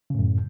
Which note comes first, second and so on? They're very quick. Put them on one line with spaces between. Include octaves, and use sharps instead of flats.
C#3 A2 F#2